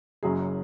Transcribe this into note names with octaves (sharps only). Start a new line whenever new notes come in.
F#1 F#2 F#3 G#4